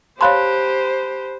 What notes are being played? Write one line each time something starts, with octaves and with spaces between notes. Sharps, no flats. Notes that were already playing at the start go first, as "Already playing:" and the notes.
G4 C5 C#5 F5 A5 B5 C6 F#6